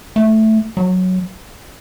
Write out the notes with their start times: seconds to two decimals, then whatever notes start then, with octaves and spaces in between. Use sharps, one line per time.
0.16 A3
0.77 F#3